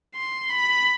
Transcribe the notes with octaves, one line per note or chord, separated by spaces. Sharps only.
C6
B5